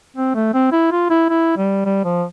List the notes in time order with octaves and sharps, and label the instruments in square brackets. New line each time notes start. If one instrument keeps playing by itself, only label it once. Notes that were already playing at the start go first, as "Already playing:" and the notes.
[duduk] C4
A3
C4
E4
F4
E4
E4
G3
G3
F3